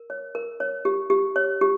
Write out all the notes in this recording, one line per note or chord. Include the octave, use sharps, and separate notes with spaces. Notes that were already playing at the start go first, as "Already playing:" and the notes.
Already playing: A#4
C#5
A#4
C#5
G4
G4
C#5
G4